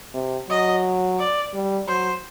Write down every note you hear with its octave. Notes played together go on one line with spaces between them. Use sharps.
C3
F#3 D#5
D5
G3
F#3 C5